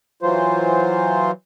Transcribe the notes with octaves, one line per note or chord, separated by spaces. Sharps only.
E3 F#3 F4 C5